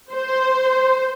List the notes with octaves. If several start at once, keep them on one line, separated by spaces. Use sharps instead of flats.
C5